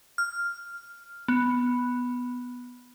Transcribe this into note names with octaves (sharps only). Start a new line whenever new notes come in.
F6
B3